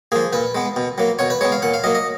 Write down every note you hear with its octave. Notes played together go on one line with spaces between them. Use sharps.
F3 A#3 G#4
A#2 B4
G#3 B3
B2
F#3 A#3
B2 C#5
B4
G#3 B3 C#5
F5
A#2 F#5
F5
F#3 A#3 D#5
D#5